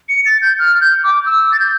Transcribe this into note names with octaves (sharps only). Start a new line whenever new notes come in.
C#7
A6
G6
F6
G6
D6
E6
A6
G6